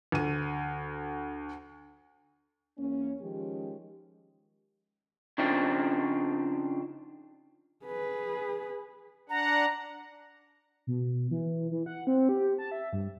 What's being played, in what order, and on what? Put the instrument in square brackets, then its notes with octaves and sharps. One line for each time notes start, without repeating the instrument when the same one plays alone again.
[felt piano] D2 D#7
[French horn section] E2 A#3 C#4
D#3 F3 G#3 C#4 G4
[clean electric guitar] C#3 F3 C4 D4 D#4
[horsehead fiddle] G#4 B4
[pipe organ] D4 F#5 [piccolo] A#5
[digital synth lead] B2
E3
E3
F#5
C4
G4
A5
E5
G2